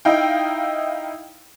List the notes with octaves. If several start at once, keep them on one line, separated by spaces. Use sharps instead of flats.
D#4 E4 F5 G5